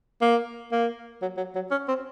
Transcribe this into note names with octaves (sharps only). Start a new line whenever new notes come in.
A#3
A#3
F#3
F#3
F#3
C#4
C4